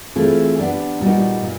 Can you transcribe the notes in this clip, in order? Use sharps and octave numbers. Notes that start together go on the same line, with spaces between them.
E3 A3 C4 F4 G#4
B3 D4 G4
A#2 G3 A#3 D#4 F#4
A#2